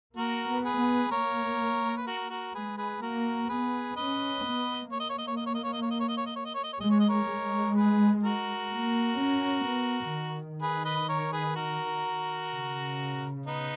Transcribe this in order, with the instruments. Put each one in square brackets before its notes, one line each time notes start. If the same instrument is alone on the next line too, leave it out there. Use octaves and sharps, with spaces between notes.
[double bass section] A#3 [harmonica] F#4 A#4
[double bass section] B3
[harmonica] G#4 B4
[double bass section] B3
[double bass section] A#3 [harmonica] A#4 C#5
[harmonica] B4
F#4 A#4
F#4 A#4
[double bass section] G#3 [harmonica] G#4 B4
[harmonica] G#4 B4
[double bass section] A#3 [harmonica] F#4 A#4
[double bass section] B3 [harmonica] G#4 B4
[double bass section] C#4 [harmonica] B4 D#5
[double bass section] B3
[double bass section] A#3 [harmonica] C#5
[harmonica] D#5
C#5
D#5
C#5
D#5
C#5
D#5
C#5
D#5
C#5
D#5
C#5
D#5
C#5
D#5
C#5
D#5
C#5
D#5
C#5
[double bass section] G#3 [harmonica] D#5
[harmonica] C#5
D#5
A#4 C#5
[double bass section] G#3
[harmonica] G#4 B4
F#4 A#4
[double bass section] A#3
C#4
B3
D#3
[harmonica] G#4 B4
B4 D#5
A#4 C#5
G#4 B4
F#4 A#4
[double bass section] C#3
[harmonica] B3 D#4